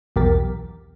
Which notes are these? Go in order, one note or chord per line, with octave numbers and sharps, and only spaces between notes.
B1 E2 G4 A#4 A6 B6